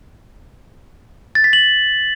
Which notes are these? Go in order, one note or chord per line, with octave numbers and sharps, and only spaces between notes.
A6
B6
F#7